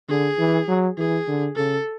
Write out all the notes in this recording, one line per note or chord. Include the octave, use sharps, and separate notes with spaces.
D3 G#4
E3
F#3
E3 G#4
D3
C#3 A4